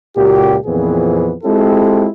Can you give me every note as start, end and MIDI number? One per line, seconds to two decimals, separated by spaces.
0.17 0.55 37
0.17 0.55 46
0.17 0.55 58
0.17 0.55 66
0.17 0.55 67
0.65 1.34 41
0.65 1.34 46
0.65 1.34 52
0.65 1.34 59
0.65 1.34 60
0.65 1.34 68
1.44 2.08 56
1.44 2.08 60
1.44 2.08 64
1.44 2.08 65
1.44 2.08 67
1.44 2.08 69